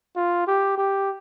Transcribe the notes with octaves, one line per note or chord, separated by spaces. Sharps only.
F4
G4
G4